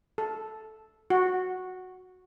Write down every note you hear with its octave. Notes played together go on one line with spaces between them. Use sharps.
A4
F#4